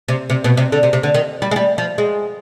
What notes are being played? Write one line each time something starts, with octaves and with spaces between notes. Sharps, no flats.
C3
C3
B2
C3
D3
C3
C3
D3
D#3
G3
G#3
G3
F3
G#3